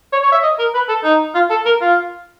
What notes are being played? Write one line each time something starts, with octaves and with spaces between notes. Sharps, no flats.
C#5
C#5
E5
D#5
A#4
B4
A4
D#4
F4
A4
A#4
F4